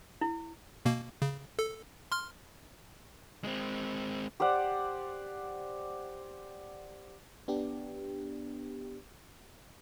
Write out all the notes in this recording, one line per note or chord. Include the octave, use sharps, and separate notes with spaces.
E4
B2 A#3
C#3
A4
C6 F6
G#3 C4
G4 C5 D5 F#5
B3 D4 G4